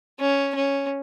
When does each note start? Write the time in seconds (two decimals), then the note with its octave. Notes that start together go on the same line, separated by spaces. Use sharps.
0.20 C#4
0.55 C#4